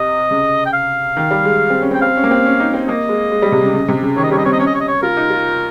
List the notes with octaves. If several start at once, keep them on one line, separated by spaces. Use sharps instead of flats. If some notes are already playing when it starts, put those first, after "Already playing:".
Already playing: C3 D#5
C#3
G5
F5
D#3
G3
G#3
C4
C#4
C4
G5
C4 F5
C#4
A#3
C4
C#4
D#4
C4
A#3 D#5
G#3
G#3
G3
C3
C#3
C#3
C3
C#3
D#3 C#5
D#5
G3 C#5
D#5
C4 C#5
D#5
C#4 C#5
D#5
C#5
D#5
C#5
F4 A#4
D#4
F4